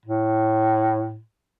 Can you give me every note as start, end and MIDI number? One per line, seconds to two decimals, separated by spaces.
0.06 1.20 45